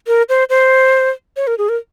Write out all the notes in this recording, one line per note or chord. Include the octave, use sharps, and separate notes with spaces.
A#4
C5
C5
C#5
A#4
G#4
A#4